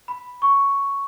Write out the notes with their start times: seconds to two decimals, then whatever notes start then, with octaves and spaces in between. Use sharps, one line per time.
0.08 B5
0.42 C#6